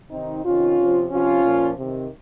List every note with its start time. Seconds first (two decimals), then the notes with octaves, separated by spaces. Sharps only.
0.11 C3 D#3 C4 D#4
0.44 C3 D#3 C#4 F4
0.77 C3 F3
1.10 C3 F3 C#4 F4
1.43 A#2 F3
1.76 C3 D#3